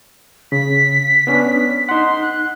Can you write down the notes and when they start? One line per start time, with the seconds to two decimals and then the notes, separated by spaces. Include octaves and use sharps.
0.52 C#3 B6
1.27 B3 C#4 D4
1.89 D#4 F#5 C6
2.21 F#6